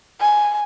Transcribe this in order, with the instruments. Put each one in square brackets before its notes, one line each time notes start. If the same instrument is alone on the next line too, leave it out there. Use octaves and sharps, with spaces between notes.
[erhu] G#5